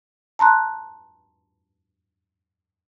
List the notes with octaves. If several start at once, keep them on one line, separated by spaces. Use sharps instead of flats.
A5 A#5 C6 F#6